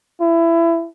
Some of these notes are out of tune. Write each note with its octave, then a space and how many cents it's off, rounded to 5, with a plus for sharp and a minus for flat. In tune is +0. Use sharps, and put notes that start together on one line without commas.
E4 +20